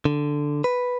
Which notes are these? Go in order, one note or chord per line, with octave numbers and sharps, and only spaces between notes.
D3
B4